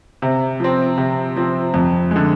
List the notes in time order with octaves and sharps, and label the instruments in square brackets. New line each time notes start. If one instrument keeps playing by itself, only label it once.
[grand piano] C3
F3 C4
C3
F3 C4
F2
D3 G#3